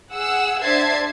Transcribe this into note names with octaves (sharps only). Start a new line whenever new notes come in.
G#4 F#5 E6
D4 C5 E5 A5 G#6 C7